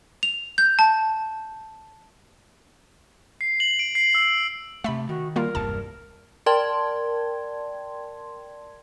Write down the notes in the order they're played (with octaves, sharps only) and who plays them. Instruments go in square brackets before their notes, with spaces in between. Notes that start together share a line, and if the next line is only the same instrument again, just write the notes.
[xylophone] F7
G6
A5
[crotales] C7
F#7
D7
C7
E6
[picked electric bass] C3 A3 [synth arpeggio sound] E5 B5
[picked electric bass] D#3 [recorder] F#4
[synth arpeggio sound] G3 A#3 F4 [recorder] A#4
[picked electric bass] E1 C2 G2 [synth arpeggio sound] A5
[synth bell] A#4 D5 G5 A5 C6 G#6